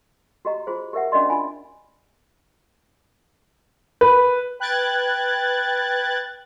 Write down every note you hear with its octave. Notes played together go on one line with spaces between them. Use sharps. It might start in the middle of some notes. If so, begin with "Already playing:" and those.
F#4 G4 D#5 A#5
F4 F#4 G#4 C5
G4 A#4 E5 F#5
C#4 D4 F#4 D5 D#5 C6
D#4 F4 G#5 B5
B4
B4 G5 F#6 G#6 A6